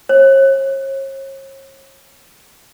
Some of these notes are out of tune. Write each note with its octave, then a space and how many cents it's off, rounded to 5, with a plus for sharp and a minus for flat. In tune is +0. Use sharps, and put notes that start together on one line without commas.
C#5 -40